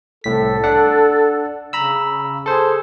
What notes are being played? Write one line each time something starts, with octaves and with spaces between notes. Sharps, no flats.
C2 A2 A4 B6
D4 F#5
C#3 A#5 B5 E6
G#4 A4 C5